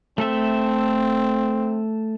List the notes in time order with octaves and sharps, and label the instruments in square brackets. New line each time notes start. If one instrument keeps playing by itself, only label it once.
[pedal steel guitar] A3 A4 E5 [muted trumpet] C4